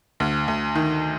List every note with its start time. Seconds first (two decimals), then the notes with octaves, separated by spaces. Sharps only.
0.20 D2
0.48 D2
0.75 D#3